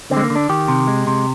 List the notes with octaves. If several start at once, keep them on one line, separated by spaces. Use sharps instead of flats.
D3 C4
G#3
A#3
D3
D4
D#3 G4
C3
G#3
C3